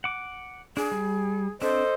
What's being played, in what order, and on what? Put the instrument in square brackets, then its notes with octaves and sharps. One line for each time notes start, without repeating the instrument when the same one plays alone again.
[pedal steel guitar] F#5 D6
[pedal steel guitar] D4 [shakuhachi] G#4
[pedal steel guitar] G3
[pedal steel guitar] C4 D4 [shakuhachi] A4 [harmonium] C5 D#5